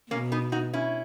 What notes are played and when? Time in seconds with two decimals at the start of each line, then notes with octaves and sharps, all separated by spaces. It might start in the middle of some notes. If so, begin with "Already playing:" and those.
0.11 B2 A#3 C#4
0.32 B3 D#4
0.52 D#4 F#4
0.73 C#4 E4